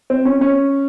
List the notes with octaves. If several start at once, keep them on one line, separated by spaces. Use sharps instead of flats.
C4
C#4
C#4